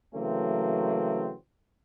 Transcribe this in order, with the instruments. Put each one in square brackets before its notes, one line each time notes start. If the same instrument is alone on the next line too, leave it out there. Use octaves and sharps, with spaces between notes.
[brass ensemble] C#3 E3 F#3 A3 A#3 C4